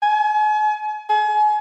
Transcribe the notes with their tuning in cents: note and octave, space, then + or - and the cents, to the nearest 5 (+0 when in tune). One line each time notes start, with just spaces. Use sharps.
G#5 +40
G#5 +35